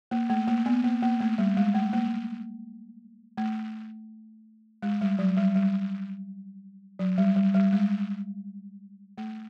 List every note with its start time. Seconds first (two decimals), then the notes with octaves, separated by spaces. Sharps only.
0.11 A#3
0.30 A3
0.48 A#3
0.66 B3
0.84 A#3
1.02 A#3
1.20 A3
1.38 G3
1.57 G#3
1.74 A3
1.93 A#3
3.37 A3
4.83 G#3
5.01 G3
5.19 F#3
5.37 G3
5.56 G3
6.99 F#3
7.18 G3
7.36 G3
7.54 G3
7.73 G#3
9.18 A3